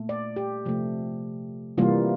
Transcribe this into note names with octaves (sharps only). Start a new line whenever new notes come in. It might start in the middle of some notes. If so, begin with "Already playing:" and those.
Already playing: A#2 A3
D5
G4
C3 F3 A3
C3 E3 G3 A#3 F4